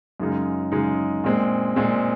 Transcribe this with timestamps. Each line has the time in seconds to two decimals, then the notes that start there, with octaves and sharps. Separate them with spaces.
0.20 F#2 C#3 G#3 D#4
0.72 F#2 C#3 G#3 D#4
1.24 A#2 G#3 C4
1.76 A#2 G#3 C4